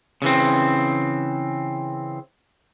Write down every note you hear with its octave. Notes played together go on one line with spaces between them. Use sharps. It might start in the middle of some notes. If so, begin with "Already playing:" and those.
C#3 E3 C4